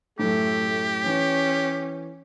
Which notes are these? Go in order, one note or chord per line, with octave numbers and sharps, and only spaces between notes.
F#2 A2 A3 G4
E3 C#4